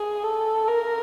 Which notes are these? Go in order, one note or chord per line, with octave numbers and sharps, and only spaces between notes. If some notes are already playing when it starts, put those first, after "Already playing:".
Already playing: G#4
A4
A#4